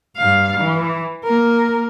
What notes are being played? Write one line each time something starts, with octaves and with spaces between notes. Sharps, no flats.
G2 F5
E3
A#3 A#4